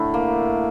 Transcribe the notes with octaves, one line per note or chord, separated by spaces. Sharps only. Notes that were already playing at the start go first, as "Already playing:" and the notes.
Already playing: A2 D3 A3
A#3